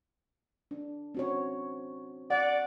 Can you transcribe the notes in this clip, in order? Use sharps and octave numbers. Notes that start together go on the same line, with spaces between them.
D4
C4 F#4 C#5
D5 F#5